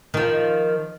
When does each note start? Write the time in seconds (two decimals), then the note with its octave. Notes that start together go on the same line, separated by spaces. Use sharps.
0.14 D#3 F3